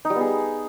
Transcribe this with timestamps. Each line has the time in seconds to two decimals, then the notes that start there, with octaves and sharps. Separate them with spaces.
0.05 D#4
0.10 G3
0.15 B3
0.21 G#4